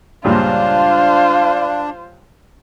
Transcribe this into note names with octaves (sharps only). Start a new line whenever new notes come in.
C#2 G2 A#2 D4 F4 C5 F5